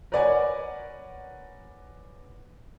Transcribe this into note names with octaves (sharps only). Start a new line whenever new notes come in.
A#4 B4 C#5 D5 F#5 G#5